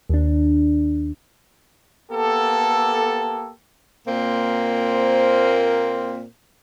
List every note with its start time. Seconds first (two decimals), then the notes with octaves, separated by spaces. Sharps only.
0.09 D#2 D4
2.12 A#3 B3 G4 A4
4.08 A#2 A#3 C4 A#4 C5